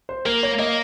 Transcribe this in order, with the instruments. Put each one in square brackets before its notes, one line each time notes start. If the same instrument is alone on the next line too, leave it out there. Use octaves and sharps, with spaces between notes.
[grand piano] C5
[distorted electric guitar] A#3 [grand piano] A#4
[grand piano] C#5
[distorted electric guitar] A#3 [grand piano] D#5